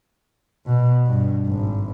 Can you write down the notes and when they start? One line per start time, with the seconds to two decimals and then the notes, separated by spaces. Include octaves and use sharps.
0.66 B2
1.07 G2
1.46 G#1